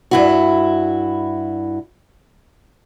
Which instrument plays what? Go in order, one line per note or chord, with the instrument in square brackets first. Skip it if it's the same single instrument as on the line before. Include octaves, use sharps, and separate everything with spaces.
[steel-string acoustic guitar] G2 E4 F#4